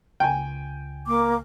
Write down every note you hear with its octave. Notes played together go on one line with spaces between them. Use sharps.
C#2 G5 G#5
A#3 D6